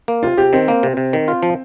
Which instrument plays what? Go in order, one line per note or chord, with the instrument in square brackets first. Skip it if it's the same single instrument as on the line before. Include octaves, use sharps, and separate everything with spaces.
[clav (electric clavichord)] A#3
[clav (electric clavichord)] C3 [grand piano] F4
[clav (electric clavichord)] C3 [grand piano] G4
[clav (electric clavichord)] D#3 [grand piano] C4
[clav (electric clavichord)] A#3
C3
C3
D#3
F4
F3